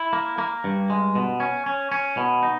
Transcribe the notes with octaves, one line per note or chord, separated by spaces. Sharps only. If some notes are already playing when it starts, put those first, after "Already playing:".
Already playing: E4
A#3
A#3
G2
G#3
B2
C#4
C#4
C#4
B2
D#4